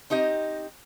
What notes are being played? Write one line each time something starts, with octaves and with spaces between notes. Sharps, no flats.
C4 D#4 G4 D#5